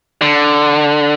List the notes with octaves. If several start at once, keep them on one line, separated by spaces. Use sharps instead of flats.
D3